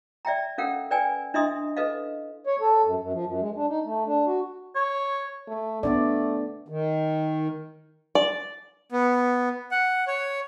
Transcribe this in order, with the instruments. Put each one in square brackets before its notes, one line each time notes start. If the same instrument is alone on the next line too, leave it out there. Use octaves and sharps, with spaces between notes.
[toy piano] D5 E5 G5 A#5
C#4 A4 A#4 F5 F#5
A#4 B4 D5 G5 G#5
D4 E4 D#5 E5 C6 D#6
A4 B4 D#5 F5
[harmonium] C#5
A4
F#2
F#2
F3
F#2
G#3
D4
D#4
A3
D4
F#4
[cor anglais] C#5
[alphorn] A3
[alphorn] A3 [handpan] B3 D4 D5
[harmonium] D#3
[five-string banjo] D5
[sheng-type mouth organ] B3
F#5
C#5